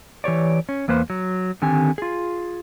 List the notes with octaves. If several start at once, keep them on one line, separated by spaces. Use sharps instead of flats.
E3 G4 C#5 D5
C#4
E2 A#3 B4 C5
F#3
D3 D#3 C4 G4 G#5
F4 G#4